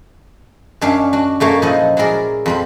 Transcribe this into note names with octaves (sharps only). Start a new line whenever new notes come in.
F#2 C#4 D4 C#5 E5 F5
D4 F#4
F#2 A3 A#3 C#5
A#2 F3 D#4 E4 D#5 F#5
F#3 E4 G#4 A#4 D5
F2 C4 B5